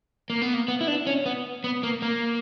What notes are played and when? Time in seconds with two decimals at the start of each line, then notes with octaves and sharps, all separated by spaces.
0.30 A#3
0.42 B3
0.54 A#3
0.68 B3
0.81 E4
0.87 D4
1.07 C#4
1.26 B3
1.64 B3
1.83 A#3
2.02 A#3